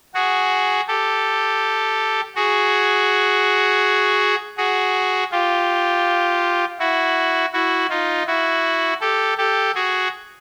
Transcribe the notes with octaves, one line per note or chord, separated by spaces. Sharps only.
F#4 G#4
G4 A4
F#4 G#4
F#4 G#4
F4 G4
E4 F#4
E4 F#4
D#4 F4
E4 F#4
G4 A4
G4 A4
F#4 G#4